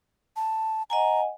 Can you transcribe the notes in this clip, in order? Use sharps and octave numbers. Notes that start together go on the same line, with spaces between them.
A5
D#5 F#5 G#5 A#5